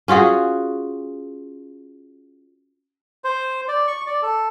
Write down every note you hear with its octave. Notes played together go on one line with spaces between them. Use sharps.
C#4 F4 F#4 G#4
C5
D5
C#6
D5
A4